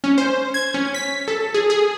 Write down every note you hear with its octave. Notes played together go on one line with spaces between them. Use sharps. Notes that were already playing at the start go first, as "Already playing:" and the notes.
C#4
C5
G#6
C#4
B6
A4
G#4
G#4